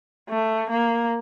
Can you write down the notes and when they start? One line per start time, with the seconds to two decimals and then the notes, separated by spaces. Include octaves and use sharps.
0.29 A3
0.70 A#3